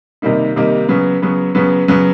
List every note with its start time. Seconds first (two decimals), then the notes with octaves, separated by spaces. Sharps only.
0.22 C3 D#3 G3 A#3 D#4
0.56 C3 D#3 G3 A#3 D#4
0.88 C#3 F#3 B3
1.22 C#3 F#3 B3
1.55 C#3 F#3 B3
1.88 C#3 F#3 B3